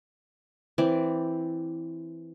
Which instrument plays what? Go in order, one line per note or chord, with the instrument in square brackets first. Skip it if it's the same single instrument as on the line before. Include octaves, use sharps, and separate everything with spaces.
[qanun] E3 C4 D5